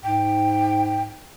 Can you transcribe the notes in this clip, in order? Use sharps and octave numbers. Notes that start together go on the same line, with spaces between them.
G#2 G5